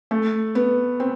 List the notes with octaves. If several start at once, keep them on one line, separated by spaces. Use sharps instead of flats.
A3
B3
C4